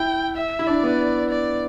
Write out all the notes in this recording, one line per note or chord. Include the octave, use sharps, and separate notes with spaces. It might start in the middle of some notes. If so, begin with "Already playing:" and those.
Already playing: E4 G5
E5
E4
D4 D5
B3
D5